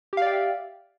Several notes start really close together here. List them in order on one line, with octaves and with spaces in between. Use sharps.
G4 F5 D5 G5 E5